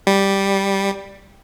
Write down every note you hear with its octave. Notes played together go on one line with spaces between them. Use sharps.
G3